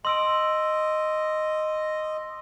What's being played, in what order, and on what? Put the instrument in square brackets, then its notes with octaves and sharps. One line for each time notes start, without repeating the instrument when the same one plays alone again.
[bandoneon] D#5 [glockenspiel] C6 E6 D7